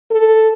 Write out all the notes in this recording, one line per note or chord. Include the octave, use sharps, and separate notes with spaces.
A4